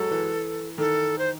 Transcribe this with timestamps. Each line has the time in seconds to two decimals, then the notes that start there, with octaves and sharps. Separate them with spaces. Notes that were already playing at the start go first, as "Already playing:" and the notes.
Already playing: F#3 G#3 A4
0.11 E3
0.78 D#3 A4
1.18 C5